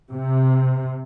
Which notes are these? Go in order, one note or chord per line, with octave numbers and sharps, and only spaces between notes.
C3